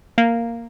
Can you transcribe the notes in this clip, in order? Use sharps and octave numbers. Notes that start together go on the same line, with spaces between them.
A#3